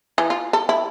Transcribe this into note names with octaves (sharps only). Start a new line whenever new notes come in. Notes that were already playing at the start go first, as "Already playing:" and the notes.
E3
F4
A4
E4